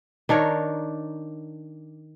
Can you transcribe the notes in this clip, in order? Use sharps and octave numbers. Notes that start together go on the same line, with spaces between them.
D#3 D4 A#4 C#5